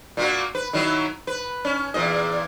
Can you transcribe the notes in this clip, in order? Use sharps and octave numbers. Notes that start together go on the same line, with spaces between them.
A#2 A#3 F#4
B4
D#3 F#3 E4
B4
C#4
E2 A#2 D#5